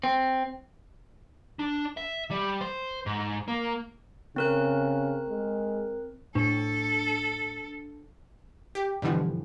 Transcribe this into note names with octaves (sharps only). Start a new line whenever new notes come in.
C4
D4
E5
G3
C5
G#2
A#3
C#3 C4 A#4 F#6
G#3
A2 D4 A4
G4
G2 B2 D3 E3 F3 G3